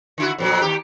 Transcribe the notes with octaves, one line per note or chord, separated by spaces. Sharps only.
D3 E4 F#4
F2 A#2 F#3
D#2 G4